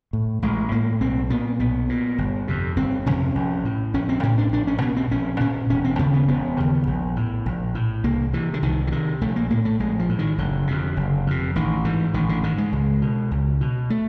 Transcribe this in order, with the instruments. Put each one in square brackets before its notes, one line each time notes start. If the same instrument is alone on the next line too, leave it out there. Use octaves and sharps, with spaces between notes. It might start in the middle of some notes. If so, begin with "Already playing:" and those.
[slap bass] A2
A1 G#3
A2 A#3
B1 C4
A#2 B3
B1 B3
A#2
G1
F2 C3
G1 C4
F2 C3 C#4
A#1
A2
A#1 C#4
C4
A2 C#4
D4
A#1 D4
C#4
A#2 B3
C4
A#1 C#4
A#2 C#4
E1 C#4
C4
D#2 C#3 B3
B3
E1 B3
D#2 C#3
A#1
A2
A#1
A2
C2 A#3
C3 E3
D3
C2 D#3
E3
C3 D#3
A#1 A3
A#3
A2 A#3
A3
A#1 G#3
F3
A2
D#3
F#1 D3
F2 C3
F#1
F2 C3
A1 D#3
G#2 E3
A1 D#3
D3
G#2 D#3
G#3
C#2
B2
C#2
B2
A3